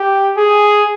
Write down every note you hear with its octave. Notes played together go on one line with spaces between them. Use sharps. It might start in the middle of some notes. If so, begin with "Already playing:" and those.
Already playing: G4
G#4